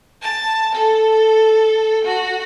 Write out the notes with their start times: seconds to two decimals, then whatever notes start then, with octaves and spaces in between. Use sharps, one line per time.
0.22 A5
0.75 A4
2.04 F#4